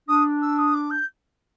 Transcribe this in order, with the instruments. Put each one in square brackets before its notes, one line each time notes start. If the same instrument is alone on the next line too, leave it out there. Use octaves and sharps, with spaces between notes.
[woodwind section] D4 [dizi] D#6
[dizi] E6
D#6
D6
G6